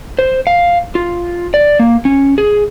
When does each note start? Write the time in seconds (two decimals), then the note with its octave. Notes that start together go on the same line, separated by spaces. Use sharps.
0.19 C5
0.47 F5
0.95 F4
1.54 D5
1.79 A#3
2.05 C#4
2.38 G#4